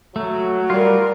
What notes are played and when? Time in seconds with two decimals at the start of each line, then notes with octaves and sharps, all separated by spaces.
0.16 F#3 A3
0.70 G3 F4 A#4